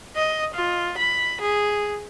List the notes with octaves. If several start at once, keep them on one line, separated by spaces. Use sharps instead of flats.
D#5
F4
B5
G#4